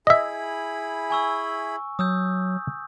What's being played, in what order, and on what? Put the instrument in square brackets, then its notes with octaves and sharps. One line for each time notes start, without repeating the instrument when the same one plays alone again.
[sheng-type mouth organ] E4 G#4 B5 [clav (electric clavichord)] D#5 E5
[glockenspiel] G#5 C#6 E6
[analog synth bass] F#3 [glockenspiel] D#6 E6 G6